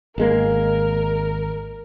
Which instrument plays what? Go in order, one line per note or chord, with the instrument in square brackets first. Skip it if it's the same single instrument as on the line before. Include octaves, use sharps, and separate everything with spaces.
[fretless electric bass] G#1 G#3 A#3 [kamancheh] A#4